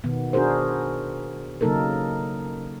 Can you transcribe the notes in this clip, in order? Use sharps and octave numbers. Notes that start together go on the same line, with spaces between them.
B2 D#3 B3
D4 F#4 G#4 A#4 C5
C#3 F#3 A#3 D#4 A4 A#4